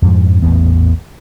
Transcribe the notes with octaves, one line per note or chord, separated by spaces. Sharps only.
F2 G#2 F3
A1 E2 A#2 B3